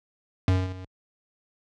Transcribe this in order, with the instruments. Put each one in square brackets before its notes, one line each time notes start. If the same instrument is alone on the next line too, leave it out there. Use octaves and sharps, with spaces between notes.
[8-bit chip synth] F#2